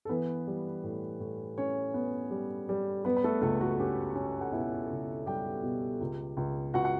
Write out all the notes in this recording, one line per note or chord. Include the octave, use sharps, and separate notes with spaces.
A4
E3 B3 B4
G3
A2
A2
A2 C#4 C#5
B3
G3
G3
G3 B3 B4
B4
A3 A4
C#2 A3 A4
F#4
C#4 G4
C#4
F#5
B2 E4 E5
C#2
G3 G4 G5
B2
C#2
C#2
C#2 F#4 F#5
F#5